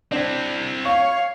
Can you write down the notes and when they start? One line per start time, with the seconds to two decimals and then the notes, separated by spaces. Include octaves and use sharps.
0.12 C4 D4 E4 C5
0.85 C#5 F5 C#6